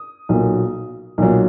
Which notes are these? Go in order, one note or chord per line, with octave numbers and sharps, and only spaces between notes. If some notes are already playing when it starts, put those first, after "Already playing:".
Already playing: D#6
B1 A#2 F#3
B1 A#2 F#3